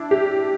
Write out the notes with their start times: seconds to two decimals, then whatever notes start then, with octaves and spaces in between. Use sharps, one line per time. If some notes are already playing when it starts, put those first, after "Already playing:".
Already playing: D4 E4
0.11 G4